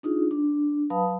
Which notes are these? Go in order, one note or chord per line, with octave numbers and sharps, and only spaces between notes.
D4 D#4 F4 G#4
D4
F#3 B4 F5 A5 B5 D#6